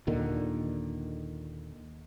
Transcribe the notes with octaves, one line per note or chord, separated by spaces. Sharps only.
D#2 A#2 D3 D#3